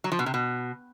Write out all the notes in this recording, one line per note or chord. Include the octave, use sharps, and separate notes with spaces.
F#3
F3
B2
C3
B2